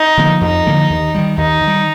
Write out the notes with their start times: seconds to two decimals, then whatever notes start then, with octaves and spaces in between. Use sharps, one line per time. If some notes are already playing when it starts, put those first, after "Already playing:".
Already playing: D#4
0.18 D3 F3 A#3
0.41 F2 D#4
0.67 D3 F3 A#3
0.90 D#2
1.14 D#3 G3
1.37 D#2 D#4
1.62 D#3
1.67 G3